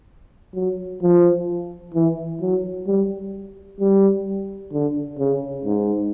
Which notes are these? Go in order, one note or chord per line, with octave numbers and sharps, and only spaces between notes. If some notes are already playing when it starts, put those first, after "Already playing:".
F#3
F3
E3
F#3
G3
G3
D3
C#3
G#2